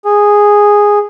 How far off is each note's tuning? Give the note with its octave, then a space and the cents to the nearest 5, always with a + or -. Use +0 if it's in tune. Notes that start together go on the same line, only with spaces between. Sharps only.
G#4 -5